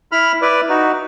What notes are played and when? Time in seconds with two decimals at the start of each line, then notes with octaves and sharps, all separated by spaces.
0.12 E4 B5 F6
0.42 E4 B4 D5
0.69 D#4 F#4